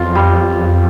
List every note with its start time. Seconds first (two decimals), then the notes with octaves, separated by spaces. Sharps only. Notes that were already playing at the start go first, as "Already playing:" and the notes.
Already playing: F2 F4
0.15 G3